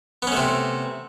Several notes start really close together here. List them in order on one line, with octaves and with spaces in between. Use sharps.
B3 C#4 A3 C3